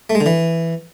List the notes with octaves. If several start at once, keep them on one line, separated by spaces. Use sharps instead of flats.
A3
G#3
D3
E3